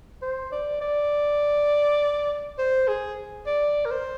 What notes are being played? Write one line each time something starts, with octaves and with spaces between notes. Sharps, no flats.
C5
D5
D5
C5
G#4
D5
A#4
C5